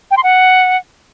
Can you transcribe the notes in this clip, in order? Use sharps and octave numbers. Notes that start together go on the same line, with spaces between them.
G5
C6
F#5